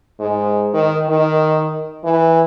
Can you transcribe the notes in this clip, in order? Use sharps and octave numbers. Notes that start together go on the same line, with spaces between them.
G#2
D#3
D#3
E3